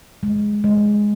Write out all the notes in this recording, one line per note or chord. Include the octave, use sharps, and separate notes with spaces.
G#3
G#3